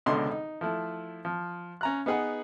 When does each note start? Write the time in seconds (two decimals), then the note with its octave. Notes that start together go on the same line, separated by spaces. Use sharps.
0.06 C#2 B2 D3 D4 D#5 C6
0.31 D#4
0.61 F3 A3 E4
1.25 F3
1.81 C#4 A#5 F#6
2.06 B3 D#4 G#4 B4 F#5